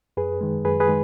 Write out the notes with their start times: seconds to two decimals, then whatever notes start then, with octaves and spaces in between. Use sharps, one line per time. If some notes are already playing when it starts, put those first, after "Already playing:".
0.17 F#2 G#4 B4
0.41 D#3 G#3
0.65 F#2 G#4 B4
0.80 G#4 B4
0.88 D#3 G#3